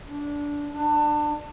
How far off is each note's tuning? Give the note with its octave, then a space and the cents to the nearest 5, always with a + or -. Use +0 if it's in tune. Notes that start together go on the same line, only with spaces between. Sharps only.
D4 -15
D4 +25